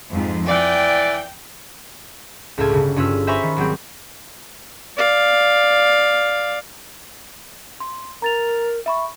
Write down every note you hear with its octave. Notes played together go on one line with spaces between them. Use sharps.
F2 G#2
E3 D5 G5
C#2 A2 F4 A4 G#6
G1 C#3
G2 C#4 F4 B4 E6
C5 E5 G#5 A#5 B5 C#6
D#3
G#1 F#3 G3 C4
D5 F5
C6
A#4 A#5 A6 F7
E5 B5 C#6